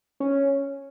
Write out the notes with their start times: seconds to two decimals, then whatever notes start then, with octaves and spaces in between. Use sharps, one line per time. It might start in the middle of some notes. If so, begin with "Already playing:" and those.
0.20 C#4